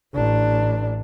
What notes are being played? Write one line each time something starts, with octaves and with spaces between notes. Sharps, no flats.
A1 D4